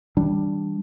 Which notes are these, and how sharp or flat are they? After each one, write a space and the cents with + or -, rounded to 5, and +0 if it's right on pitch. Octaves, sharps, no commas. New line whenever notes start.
E3 -35 G3 +5 D4 +0